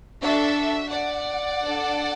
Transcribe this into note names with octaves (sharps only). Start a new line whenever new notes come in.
D4 F#4 A4 E5
D5 F#5
D4 A4